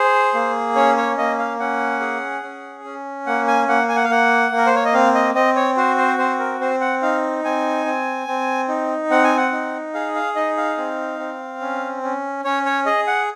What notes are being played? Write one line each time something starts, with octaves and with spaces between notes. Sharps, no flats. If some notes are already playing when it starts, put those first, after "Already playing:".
Already playing: G#4 C5
A#3
C#4 C#5
C#5
A#3 D#5
F5
C#4 F#5
G#4
C#4
C#4
A#3 F#5
G#5
A#3 F#5
G#5
F#5
F5
A#3 F#5
A#3
A#4
C5
C#5
D#5
C4 F5
D#5
C4 D#5
C#5
F#4 C5
C5
C4 C5
A#4
C4 C5
F#5
D#4 F5
C4 G#5
C4
C4
D#4
C4 F#5
G#5
F#5
D#4
G#4 F5
F5
D#4 D#5
F5
C4
C4
C#4
C#4
C#4 C#5
C#5
G#4 D#5
F#5